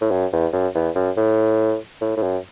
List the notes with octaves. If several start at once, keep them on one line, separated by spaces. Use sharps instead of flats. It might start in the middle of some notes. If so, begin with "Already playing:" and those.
A2
F#2
E2
F#2
E2
F#2
A2
A2
A2
F#2